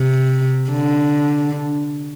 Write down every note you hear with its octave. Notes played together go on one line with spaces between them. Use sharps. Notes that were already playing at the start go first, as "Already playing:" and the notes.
Already playing: C3
D3